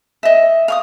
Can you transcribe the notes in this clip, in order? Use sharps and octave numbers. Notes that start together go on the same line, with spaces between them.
D#5 E5
F5 C#6 D#6